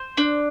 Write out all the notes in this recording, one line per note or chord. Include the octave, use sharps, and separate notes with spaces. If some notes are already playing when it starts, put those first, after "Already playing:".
Already playing: C5
D4